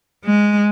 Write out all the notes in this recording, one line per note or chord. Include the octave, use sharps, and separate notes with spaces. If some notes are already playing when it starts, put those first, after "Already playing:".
G#3